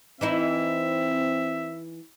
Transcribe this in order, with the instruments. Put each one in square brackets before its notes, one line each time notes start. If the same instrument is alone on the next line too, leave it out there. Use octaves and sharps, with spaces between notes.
[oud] E3 D#4 E4 [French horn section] C4 [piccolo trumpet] E5